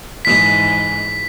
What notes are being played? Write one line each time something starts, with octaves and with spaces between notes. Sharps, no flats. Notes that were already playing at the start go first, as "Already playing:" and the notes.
G#2 E3 G#3 B6